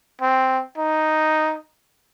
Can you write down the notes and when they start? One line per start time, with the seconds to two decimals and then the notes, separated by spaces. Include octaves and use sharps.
0.22 C4
0.78 D#4